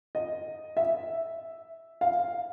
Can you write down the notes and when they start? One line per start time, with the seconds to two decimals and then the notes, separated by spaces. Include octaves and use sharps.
0.15 D#5
0.77 E5
2.01 F5